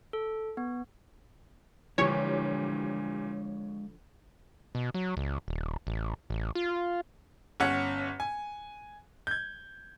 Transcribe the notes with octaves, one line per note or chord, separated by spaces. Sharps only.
A4
B3
A#2 D3 E3 F3 G3 G#3 D4 C#5
B2
F#3
C#2
D#1
A1
A1
F4
G1 C#4 F#5
G#5
G6 G#6